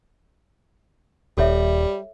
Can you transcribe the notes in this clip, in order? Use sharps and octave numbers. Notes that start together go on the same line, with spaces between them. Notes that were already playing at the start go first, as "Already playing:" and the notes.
D#1 G3 A4 C#5 E5